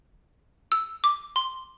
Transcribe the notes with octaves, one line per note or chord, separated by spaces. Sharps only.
E6
D6
C6